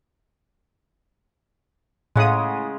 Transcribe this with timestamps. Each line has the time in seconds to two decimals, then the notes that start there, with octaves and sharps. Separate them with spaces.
2.16 A2 C#3 G#3 F#5 D#6